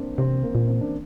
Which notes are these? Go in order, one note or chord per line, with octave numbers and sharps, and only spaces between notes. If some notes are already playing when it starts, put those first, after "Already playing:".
Already playing: A#3 C4 D4
C3 C4
A#3
A#2
C4
D4